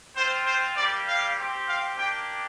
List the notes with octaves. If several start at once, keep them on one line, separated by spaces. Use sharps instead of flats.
C4 F4 C5
C5
G3 A#3 G4 D5
F5
C4 G4
F5
A#3 D4 G4 G5